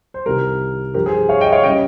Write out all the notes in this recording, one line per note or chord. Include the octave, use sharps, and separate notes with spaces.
C5
C2 C3 D#3 G3 G4 A#4
G2 F3 G4 A#4
G#4 C5
C#5 F5
D#5 G5
C#5 F5
C#3 G3 D#5 G5